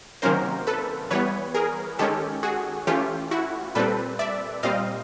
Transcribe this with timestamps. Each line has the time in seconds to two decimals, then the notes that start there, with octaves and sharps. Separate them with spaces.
0.22 C3 D#3 F#3 A#3 C#4 A#4 C5
0.67 A4 B4
1.11 E3 G3 B3 B4 C#5
1.54 G#4 A#4
1.99 D#3 G#3 C#4 G4 A4
2.43 F#4 G#4
2.87 E3 A3 C#4 F4 G4
3.31 E4 F#4
3.75 A#2 G3 C4 A4 B4
4.19 D5 E5
4.63 A#2 G3 C4 D#5 F5